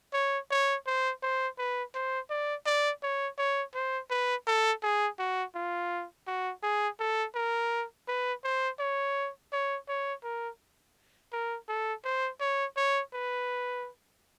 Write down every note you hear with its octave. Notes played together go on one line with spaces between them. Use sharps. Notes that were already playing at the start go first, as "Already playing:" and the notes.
C#5
C#5
C5
C5
B4
C5
D5
D5
C#5
C#5
C5
B4
A4
G#4
F#4
F4
F#4
G#4
A4
A#4
B4
C5
C#5
C#5
C#5
A#4
A#4
A4
C5
C#5
C#5
B4